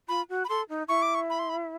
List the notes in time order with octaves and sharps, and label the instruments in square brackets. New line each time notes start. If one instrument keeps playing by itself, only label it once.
[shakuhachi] F4 [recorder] B5
[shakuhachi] F#4
[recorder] B5
[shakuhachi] A4 [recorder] C6
[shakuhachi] D#4
[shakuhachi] E4 [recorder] C#6
[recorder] D6
C#6
B5
C6
B5